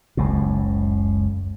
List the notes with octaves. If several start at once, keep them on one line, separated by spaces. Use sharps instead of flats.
F#1 C#2 A2